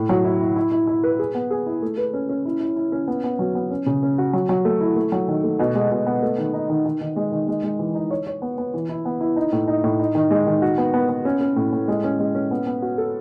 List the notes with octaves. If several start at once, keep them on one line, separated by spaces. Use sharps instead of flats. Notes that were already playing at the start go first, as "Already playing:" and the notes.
Already playing: A2
F#3
E4
E4
E4
E4
E4
B4
G#4
B3
G#4
E4
A3
B4
C#4
C#4
E4
E4
E4
C#4
B3
B3
F#3
B3
C#4
C#3
C#4
F#4
F#3
F#3
A3
E4
A3
F#3
D#3
A3
B2
G#3
B2
B3
A3
D#3
D#4
D#3
D#3
D#3
G#3
D#3
G#3
G#3
E3
D#4
C#5
C#5
B3
B3
E3
E4
B3
E4
D#4
A2
D#4
A2
D#4
D#3
G#3
D#3
F#4
B3
B3
B3
C#4
C#4
A2
A2
G#3
C#4
G#3
C#4
B3
B3
F#4
A4